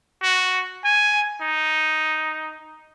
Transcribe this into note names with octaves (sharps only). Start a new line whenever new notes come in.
F#4
G#5
D#4